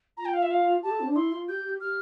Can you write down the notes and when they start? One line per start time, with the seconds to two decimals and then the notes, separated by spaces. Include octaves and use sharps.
0.17 F4 A#5
0.25 G5
0.34 F5
0.42 E5
0.51 F5
0.83 G4 A5
0.91 A4
1.00 C4
1.08 D4
1.16 E4 C6
1.32 F4
1.49 G4 G6
1.64 G4
1.81 G4 F6